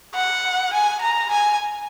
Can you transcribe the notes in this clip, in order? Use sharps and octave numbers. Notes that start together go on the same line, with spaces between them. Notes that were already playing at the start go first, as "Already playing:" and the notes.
F#5
G#5
A#5
G#5